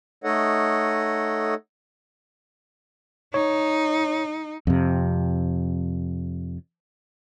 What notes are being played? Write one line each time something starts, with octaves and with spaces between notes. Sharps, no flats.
A3 D#4 A4 C#5 D#5 F#5
D#4 C#5
F2 C3